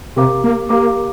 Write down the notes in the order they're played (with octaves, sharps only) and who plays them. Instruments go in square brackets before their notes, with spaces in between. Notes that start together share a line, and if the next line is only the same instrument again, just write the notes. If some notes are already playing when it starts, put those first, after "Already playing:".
[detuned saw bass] C3 [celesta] G4 A#4 F5 A#5 D6
[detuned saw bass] A#3
[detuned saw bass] A#3 [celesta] G4 A#4 F5 A#5 D6